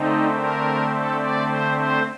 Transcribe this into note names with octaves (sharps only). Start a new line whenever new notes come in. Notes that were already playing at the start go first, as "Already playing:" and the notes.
Already playing: D3 A3 C4 D#4
A#4
A4
D5
C5
C5